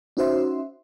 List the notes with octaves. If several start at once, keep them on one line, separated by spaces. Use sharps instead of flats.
C#4 D#4 F#4 C5 E5 C6